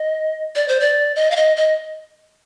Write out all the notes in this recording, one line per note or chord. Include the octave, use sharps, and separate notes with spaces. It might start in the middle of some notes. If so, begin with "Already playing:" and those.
Already playing: D#5
D5
C5
D5
D#5
F5
D#5
D#5